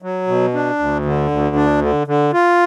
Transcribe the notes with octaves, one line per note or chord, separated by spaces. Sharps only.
F#3
B2
D4
D2
D3
D2
D4
D3
D3
F4